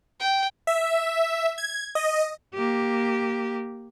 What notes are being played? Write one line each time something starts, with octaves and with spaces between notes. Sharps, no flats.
G5
E5
G#6
D#5
A#3 G4